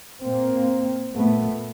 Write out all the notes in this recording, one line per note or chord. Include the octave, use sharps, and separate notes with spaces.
A#2 A#3 C4
A#2 A3 B3